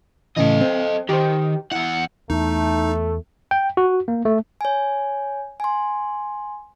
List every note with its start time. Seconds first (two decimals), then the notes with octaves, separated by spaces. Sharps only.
0.36 A2 C#3 E3 A4 D#5
0.61 C4
1.09 D#3 G4 C5
1.72 E2 E4 F#5
2.30 E2 A3 D#4
3.51 G5
3.77 F#4
4.08 A#3
4.25 A3
4.61 C#5 G#5
5.60 G#5 C6